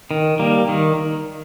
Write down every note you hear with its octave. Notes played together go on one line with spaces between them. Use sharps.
D#3
G3 A#3
D#3